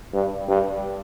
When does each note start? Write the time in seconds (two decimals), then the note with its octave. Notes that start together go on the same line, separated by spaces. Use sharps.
0.13 G2
0.48 G2